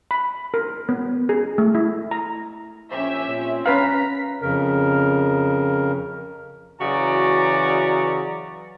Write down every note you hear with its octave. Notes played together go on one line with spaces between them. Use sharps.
B5
A#4
B3
G#4
A3
E4
A#5
A#1 C#4 G4 E5
A#2 C4
C#4 B4 F5 A#5 B6
F2 C#3 A#4
C#3 E3 F#3 F#4 D5 A#5